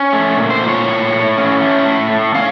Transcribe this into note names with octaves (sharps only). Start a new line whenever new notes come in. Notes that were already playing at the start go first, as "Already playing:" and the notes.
Already playing: C#4
A3
A#2
C5
A#2
C#5
A2
A2
C#4
A3
A2
A2
C#4 F5